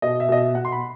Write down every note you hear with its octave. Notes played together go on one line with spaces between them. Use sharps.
B2 D#5
E5
B2 D#5
E5
B2 F#5
C6
B5